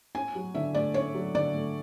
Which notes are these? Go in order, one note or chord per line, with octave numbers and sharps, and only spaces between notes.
C#4 G#5
F#3
D3 E5
A3 D5
C#4 C#5
F#3
D3 D5
A3